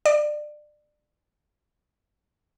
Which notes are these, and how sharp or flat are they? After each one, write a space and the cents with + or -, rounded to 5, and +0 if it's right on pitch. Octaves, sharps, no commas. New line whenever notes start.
D5 +25